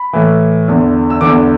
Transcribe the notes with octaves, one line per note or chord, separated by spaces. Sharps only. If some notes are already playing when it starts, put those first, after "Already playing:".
Already playing: B5
A2 E3
E2 D3
E6
E2 D3 D6